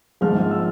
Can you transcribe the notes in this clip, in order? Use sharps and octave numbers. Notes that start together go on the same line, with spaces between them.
A#1 G#2 F3 G#3 F6
E6